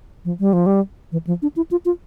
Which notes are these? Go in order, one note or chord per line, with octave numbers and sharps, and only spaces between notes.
F3
G3
F3
G3
E3
F3
D4
E4
F4
F4